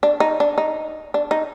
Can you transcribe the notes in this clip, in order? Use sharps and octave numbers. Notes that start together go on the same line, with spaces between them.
D4
D#4
D4
D#4
D4
D#4